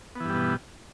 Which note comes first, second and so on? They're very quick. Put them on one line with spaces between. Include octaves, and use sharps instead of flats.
B3 E3 G2 G3 B2